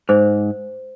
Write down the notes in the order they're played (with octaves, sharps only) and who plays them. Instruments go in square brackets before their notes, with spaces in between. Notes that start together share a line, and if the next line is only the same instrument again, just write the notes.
[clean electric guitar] G#2 [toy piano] C5